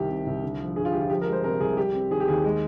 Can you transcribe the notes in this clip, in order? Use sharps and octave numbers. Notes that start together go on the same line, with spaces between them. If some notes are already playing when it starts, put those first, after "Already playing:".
Already playing: C2 D#3 G4
C3
C2
D3
F3
G2 G#4
F4
G1 G4
F4
F3 G4
A#4
G#3
C5
C3 A#4
C2 G#4
G3 G4
C4
D#3 G#4
G4
D#2 G#4
G#3